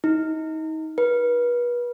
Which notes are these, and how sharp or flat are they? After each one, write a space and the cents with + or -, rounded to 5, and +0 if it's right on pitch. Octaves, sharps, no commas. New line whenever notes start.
D#4 +30
B4 -35